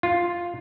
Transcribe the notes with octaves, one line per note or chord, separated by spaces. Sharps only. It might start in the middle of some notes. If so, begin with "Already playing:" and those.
F4